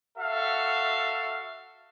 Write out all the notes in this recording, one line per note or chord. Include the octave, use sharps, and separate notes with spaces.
F#4 A4 E5 F5